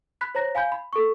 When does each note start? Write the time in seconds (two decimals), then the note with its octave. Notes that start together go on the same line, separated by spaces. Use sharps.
0.21 B5 F#6 B6
0.35 C5 C#5 A#5 A#6
0.55 F5 G#5 B5 G6
0.72 B5
0.93 A4 C#6